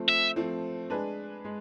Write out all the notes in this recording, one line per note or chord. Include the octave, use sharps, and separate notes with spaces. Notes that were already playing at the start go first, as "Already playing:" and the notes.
Already playing: F3 A3 C4
E5
F3 A3 C4
G#3 D4 G#4 B4
G#3